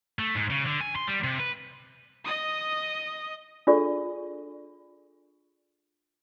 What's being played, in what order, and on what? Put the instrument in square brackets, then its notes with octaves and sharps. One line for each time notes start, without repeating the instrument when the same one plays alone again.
[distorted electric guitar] A3
G#2
C#3
D3
G#5
C6
G3
C3
B4
[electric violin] D#5 D#6
[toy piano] D4 F4 G#4 A4 D5 C#6